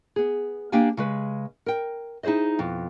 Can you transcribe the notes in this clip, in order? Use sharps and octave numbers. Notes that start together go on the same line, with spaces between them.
B3 G#4
A#3 D4 G4 F5 G5 G#5
C#3 G#3 B4
A#4 G5
D#4 E4 G#4 C5 D#5
F2 B2